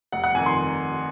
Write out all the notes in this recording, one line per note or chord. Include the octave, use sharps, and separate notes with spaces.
F1 F#5
F#5
F2 D#3 G#5
C6